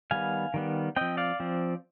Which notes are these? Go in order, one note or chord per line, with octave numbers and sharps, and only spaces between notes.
D#3 G3 B3 F5 G#5
D#3 G3 B3
F3 C4 D#5 G5
D5 F5
F3 C4